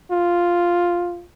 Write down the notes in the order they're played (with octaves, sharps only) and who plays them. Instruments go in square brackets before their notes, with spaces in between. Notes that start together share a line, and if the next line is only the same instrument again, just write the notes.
[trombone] F4